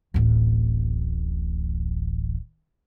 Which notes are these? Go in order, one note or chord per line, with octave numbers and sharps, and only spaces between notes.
D1 A1